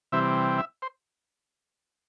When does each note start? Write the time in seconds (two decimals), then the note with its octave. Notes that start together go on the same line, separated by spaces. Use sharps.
0.12 C3 E3 G3 C4 E5
0.58 E5
0.82 C5